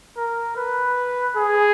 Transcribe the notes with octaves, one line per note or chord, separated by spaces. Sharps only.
A#4
B4
G#4